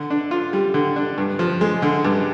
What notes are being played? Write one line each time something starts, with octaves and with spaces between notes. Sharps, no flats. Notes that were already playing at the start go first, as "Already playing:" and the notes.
Already playing: D3
D4
F4
G3
D3
D4
G2
F3
G#3
D3
G2